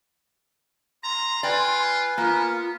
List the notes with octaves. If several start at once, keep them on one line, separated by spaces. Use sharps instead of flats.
A#5 C6
F4 B4 D5 G5 G#5
A#3 B3 F4